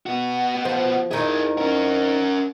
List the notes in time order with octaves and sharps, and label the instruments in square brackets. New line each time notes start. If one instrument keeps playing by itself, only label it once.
[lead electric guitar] B3 F#4
[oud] F3 C5
[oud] F2 D#3 E4 [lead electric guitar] G#4 A#4
[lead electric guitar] C#4 A#4